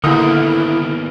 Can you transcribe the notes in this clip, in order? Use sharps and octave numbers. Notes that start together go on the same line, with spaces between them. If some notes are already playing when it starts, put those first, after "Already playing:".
A#1 D3 D#3 A#3 B3 E4 A#4 D#6